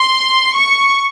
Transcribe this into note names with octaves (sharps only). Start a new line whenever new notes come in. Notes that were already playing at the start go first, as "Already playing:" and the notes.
Already playing: C6
C#6